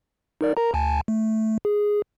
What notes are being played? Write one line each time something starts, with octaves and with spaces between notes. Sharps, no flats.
D#4 A#4 D5
A#4 A#5
D2 G#5 A5
A3
G#4